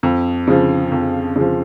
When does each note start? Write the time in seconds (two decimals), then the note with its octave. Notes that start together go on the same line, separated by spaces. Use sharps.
0.03 F2
0.48 C#3 F3
0.92 F2
1.36 C#3 F3